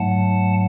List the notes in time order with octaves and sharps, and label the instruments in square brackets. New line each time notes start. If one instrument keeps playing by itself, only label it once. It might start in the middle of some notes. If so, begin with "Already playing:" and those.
Already playing: [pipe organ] G#2 F#3 A3 F#5 A5